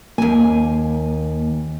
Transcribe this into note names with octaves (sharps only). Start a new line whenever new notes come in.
D#2 A#3 G#5